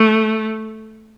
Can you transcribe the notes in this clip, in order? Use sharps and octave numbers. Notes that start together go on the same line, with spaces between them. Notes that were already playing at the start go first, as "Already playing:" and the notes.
Already playing: A3